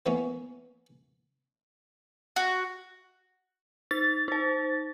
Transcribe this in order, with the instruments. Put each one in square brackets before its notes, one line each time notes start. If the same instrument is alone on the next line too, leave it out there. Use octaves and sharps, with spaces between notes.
[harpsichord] E3 A#3 B3 C#4
[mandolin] F#4
[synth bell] D#4 [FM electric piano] A6
[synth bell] D#4 C5